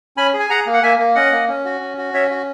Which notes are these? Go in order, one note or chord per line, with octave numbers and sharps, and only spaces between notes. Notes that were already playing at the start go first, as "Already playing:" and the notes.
C#4 G#5 B5
G#4
G#5
G#4 F#5 A#5
A#3
F#5
A#3 E5 G#5
A#3
C#4 D#5 F#5
A#3
C#4
F#4
C#4
F#4
C#4 C#5 E5
F#4